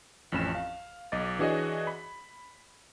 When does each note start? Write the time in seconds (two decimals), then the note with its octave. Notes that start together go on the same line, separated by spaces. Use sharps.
0.32 A1 F2 C#4 B5 E7
0.55 F5
1.12 B1 D#5 D6 A6
1.39 E3 D4 F#4 G#4 C#5 D#5
1.87 B5